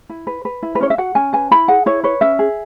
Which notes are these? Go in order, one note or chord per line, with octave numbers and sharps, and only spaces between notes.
E4
B4
B4
E4
B4
C#4 C#5
E5
F#4 F#5
C#4 G#5
B4 G#5
E4 B5
G#4 F#5
E4 C#5
B4 C#5
C#4 E5
G#4